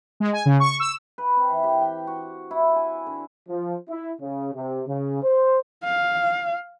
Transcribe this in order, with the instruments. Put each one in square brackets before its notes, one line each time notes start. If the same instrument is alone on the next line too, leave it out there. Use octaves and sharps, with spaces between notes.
[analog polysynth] G#3
G#5
C#3
C#6
E6
[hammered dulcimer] B4
C4
E3
G4
G5
F#4
E4
G#5
D3
[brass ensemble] F3
E4
C#3
C3
C#3
C5
[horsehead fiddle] F5